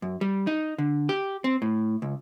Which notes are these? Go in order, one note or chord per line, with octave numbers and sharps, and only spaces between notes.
F#2
G3
D#4
D3
G4
C4
A2
C#2